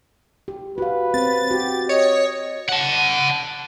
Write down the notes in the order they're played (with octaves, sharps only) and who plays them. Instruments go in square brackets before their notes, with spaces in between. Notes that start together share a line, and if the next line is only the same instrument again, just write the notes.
[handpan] G4
[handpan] F#4 F5 [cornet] B4
[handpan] C4 [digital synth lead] A6
[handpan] F#4 [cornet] G4
[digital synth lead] C#5 [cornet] D#5
[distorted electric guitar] F#5 A5